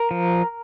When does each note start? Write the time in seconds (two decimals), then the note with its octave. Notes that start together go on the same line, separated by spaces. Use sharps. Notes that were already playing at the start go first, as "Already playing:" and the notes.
Already playing: A#4
0.11 F3